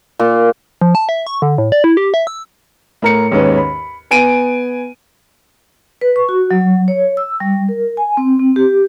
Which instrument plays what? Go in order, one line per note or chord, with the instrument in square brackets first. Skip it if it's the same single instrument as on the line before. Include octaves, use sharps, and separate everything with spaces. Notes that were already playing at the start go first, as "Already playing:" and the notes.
[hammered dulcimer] A#2
[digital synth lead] F3
A5
E5
C#6
D3
A2
D5
E4
G4
E5
E6
[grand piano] A2 A#4 C#7
D#2 G#2 C#4 B4
B5
B3 G#5 D7 D#7
[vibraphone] B4
C#6
F#4
F#3
C#5
E6
G3
A#4
G#5
C4
C4
G4